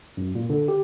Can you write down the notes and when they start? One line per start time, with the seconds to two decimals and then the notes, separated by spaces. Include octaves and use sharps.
0.17 F#2
0.35 A#2
0.50 D3
0.68 G4